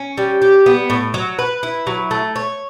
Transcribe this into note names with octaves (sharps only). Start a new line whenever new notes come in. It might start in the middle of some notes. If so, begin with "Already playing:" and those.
Already playing: C#4
G3
G4
B3
A2
F#3
B4
E4
F#3
A3
C#5